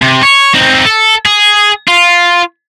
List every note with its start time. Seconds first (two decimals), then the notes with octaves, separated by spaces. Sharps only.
0.02 C3
0.23 C#5
0.54 C4 D#4
0.85 A4
1.26 G#4
1.88 F4